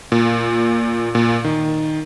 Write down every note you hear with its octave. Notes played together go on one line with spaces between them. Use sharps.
A#2
A#2
D#3